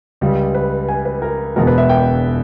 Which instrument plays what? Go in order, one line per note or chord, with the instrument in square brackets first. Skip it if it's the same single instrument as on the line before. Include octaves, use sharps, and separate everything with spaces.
[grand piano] C#2 C#3 G3
B4
G#5
B4
A#4
E1 E2 B2 G#3 A#4
B4
E5
G5